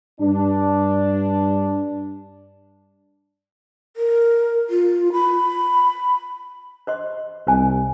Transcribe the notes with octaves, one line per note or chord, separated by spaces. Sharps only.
G2 D4
A#4
F4
B5
C5 D#5 C6
C2 C5 G#5